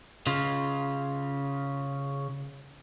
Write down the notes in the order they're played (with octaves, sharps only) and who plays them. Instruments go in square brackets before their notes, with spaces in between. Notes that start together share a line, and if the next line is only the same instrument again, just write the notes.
[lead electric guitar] C#3 F4